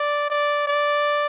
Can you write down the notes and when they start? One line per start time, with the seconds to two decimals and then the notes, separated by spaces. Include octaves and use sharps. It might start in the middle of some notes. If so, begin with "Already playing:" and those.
Already playing: D5
0.30 D5
0.67 D5